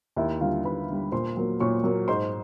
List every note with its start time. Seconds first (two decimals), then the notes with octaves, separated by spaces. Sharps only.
0.16 D#2 E4 E5
0.40 D3 G3 F4 F5
0.65 D#2 B4 B5
0.89 D3 G3
1.12 A#2 C5 C6
1.37 F#3 A#3
1.60 A#2 C#5 C#6
1.84 F#3 A#3
2.08 G#2 C5 C6